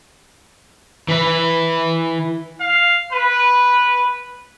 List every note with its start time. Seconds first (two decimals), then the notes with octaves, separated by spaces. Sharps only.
1.09 E3 B4
2.60 F5
3.12 B4